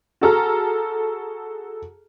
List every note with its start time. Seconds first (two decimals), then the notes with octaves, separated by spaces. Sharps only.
0.21 F#4 G#4 A4 A#5 F6